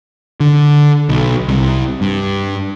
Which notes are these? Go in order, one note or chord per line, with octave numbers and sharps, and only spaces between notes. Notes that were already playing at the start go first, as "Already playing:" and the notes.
D3
B1
C2
G2